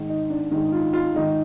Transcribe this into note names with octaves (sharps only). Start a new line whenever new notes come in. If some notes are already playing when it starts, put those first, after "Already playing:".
Already playing: G#2 D#3
D#4
D4
G#2 D#3 D#4
F4
F4
G#2 D#3 D#4